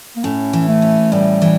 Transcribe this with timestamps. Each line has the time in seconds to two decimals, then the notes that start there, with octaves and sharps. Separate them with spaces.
0.16 A#3
0.24 A2 C#4
0.53 E3
0.68 A3
0.82 C#4
1.12 A2 G3
1.42 E3